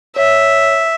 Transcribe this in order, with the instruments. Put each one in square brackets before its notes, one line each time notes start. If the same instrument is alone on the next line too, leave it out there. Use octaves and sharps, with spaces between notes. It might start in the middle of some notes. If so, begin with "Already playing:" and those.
[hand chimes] C#5 [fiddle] E5